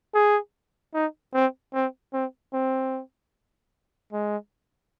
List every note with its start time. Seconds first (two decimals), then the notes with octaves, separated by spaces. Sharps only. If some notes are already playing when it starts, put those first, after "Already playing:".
0.14 G#4
0.94 D#4
1.34 C4
1.74 C4
2.13 C4
2.53 C4
4.13 G#3